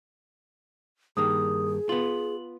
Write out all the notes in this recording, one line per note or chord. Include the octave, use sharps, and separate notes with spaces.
G2 D#3 A#3 G#4 D#6
B3 F4 F#7